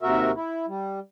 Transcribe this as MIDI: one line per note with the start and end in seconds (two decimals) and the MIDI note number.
0.02 0.31 39
0.02 0.31 48
0.02 0.31 66
0.02 0.31 70
0.02 0.31 76
0.36 0.66 64
0.67 0.99 55